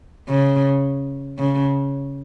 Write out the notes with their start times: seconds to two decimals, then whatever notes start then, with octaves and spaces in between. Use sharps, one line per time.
0.29 C#3
1.39 C#3